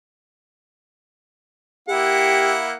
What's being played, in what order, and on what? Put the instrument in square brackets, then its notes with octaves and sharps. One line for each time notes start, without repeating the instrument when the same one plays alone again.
[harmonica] A#3 E4 F#5 [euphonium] G4